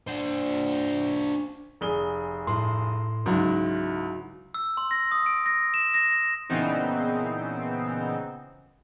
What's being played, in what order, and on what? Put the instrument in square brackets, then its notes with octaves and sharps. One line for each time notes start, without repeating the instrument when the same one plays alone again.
[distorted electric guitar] D4 C5
[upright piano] F1 G#4 G7
[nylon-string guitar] A2 [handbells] C6
[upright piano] C#2 G#2 [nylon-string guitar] F#3 D#4 E4
[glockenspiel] E6
C6
A#6
D#6
D7
A#6
E7
A#6
A#6
[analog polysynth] A#2 C#3 E3 B3 C4 D#4